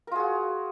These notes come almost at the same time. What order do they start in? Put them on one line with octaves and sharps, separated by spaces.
A#4 F4 G#4 F#4